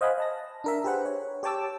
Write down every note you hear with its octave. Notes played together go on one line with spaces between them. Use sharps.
C5 D#5 F5 F#5 G#5 B5
D#5 A5 A#6
D4 A#4 E5
G4 G#4 B4 C5 F#5
C#5
G4 C#5 G5 A5 D6 E6